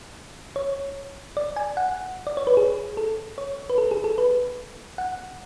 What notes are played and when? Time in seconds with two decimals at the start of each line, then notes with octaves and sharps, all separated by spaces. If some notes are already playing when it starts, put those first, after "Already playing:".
0.56 C#5
1.37 D5
1.56 G#5
1.77 F#5
2.27 D5
2.37 C#5
2.47 B4
2.57 G#4
2.97 A4
3.38 C#5
3.70 B4
3.78 A4
3.91 G#4
4.04 A4
4.18 B4
4.98 F#5